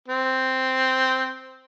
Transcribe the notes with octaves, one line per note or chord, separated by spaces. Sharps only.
C4